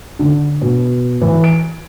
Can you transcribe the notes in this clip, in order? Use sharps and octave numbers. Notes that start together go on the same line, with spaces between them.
D3
B2
E3
D7